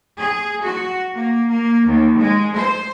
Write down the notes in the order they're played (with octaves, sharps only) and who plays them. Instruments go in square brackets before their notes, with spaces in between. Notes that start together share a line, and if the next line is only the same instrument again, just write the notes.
[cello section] G#4
F#4
A#3
A#3
D#2
G#3
C5